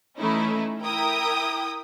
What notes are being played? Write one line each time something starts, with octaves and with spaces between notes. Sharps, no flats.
E3 A3 C#4 D#4 E4
E4 A#4 G5 D#6